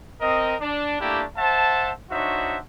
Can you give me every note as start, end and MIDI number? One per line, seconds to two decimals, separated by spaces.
0.20 0.53 60
0.20 0.53 70
0.20 0.53 75
0.60 0.97 62
1.00 1.22 57
1.00 1.22 58
1.00 1.22 62
1.00 1.22 64
1.00 1.22 67
1.36 1.90 72
1.36 1.90 76
1.36 1.90 78
1.36 1.90 81
2.10 2.57 62
2.10 2.57 63
2.10 2.57 66
2.10 2.57 72
2.10 2.57 73
2.10 2.57 76